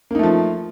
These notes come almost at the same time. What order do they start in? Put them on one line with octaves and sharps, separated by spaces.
A#3 D#4 A3 F3